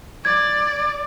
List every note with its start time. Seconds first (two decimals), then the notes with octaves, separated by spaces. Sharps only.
0.25 D5 G#6